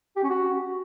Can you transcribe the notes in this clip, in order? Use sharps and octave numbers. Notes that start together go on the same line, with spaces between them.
G4
C#4
F#4